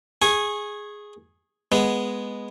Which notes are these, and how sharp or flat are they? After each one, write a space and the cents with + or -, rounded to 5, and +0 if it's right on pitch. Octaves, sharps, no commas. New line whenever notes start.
G#4 +0 G#5 +0 C#6 -25
G#3 +0 B3 +0